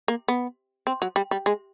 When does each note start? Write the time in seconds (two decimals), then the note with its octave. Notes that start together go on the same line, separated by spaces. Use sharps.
0.08 A#3
0.28 B3
0.87 C4
1.02 F#3
1.16 G3
1.31 G3
1.46 G#3